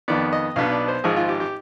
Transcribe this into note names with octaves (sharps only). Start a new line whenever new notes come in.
F2 D#3 B3 D5
D#5
B1 B2 B3 D4 F5
D5
C5
G#1 G#2 F3 G#4
F4
G4
G4